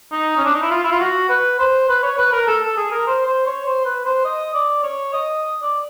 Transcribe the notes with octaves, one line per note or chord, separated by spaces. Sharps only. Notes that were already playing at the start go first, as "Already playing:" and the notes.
D#4
C#4
D4
D#4
E4
F4
E4
F4
F#4
B4
C5
B4
C#5
B4
A#4
A4
A4
G#4
A#4
C5
C5
C#5
C5
B4
C5
D#5
D5
C#5
D#5
D5